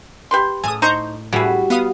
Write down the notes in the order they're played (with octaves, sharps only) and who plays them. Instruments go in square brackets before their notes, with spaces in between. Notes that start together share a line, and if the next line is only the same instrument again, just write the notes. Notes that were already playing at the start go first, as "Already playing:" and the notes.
[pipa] G4 B4 C6
[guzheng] A2 A5 [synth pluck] G#5 D#6
[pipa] D#4 C5 [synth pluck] A#5 C#6 G6
[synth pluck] A2 [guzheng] G3 F#4 B5 [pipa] E4 G#4
[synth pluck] B3 F5 D#6